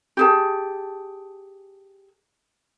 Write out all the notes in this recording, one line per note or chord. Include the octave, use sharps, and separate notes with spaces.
G4 G#4 A5